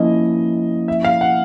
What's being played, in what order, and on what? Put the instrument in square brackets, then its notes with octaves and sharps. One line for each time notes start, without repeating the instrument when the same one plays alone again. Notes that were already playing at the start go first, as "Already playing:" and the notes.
Already playing: [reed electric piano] F3 A#3 C#4 E4 [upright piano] D#5
[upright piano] E5
F5
F#5